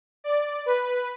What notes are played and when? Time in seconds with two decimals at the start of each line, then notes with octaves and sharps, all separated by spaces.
0.24 D5
0.66 B4